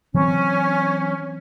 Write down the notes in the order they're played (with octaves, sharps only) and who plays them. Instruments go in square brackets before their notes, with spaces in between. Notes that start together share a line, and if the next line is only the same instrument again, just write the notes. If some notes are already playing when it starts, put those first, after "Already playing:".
[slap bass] E3 F#3 C4 [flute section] C#4